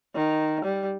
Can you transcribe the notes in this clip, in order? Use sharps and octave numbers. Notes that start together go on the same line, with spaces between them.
D#3
G3